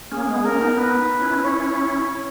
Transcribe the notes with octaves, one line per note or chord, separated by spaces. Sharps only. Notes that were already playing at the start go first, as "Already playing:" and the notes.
A#3 C#4 G#4
G#3 B3
A#3 C#4 A#4
B3 D#4
B3 D#4 B4
C#4 E4
C#5